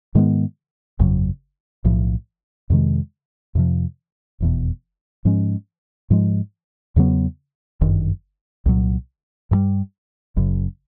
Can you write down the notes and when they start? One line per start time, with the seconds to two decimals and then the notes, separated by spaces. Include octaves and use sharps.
0.15 G#2 D#3 G#3 B3
0.99 G1 F2 C#3 F#3
1.85 B1 A2 F3
2.70 F2 C3 D#3 G#3
3.55 F2 C3 F3
4.40 F1 E2 B2
5.25 G#2 F3 G#3 C#4
6.10 G#2 F3 G#3
6.96 E2 C#3 F#3 B3
7.81 G1 F#2 D#3
8.66 C2 A#2 F#3
9.51 G2 E3 G3
10.36 F#1 F#2 C#3